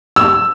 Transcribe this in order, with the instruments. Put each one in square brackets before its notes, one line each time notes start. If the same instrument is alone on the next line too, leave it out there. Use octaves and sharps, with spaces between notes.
[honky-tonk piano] E6